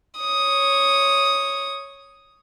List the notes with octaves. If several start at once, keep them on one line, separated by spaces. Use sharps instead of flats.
C#5 D#6